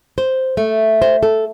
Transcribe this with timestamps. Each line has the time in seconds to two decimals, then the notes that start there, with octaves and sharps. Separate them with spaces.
0.18 C5
0.57 A3
1.02 C5
1.23 A4